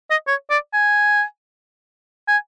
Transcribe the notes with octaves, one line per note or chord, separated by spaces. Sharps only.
D#5
C#5
D5
G#5
G#5